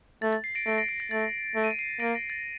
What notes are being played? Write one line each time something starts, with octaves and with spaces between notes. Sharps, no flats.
A3 A6
A6
C7
A#6 D7
A3 A#6 D7
A#6 D7
C7
A#6
A3 A6
A3
D#7
D7
C7 D#7
A#3 A#6 D7
A#6 D7
A6